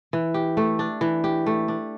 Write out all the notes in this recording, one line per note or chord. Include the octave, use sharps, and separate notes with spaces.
E3
G4
A3
D4
E3
G4
A3
D4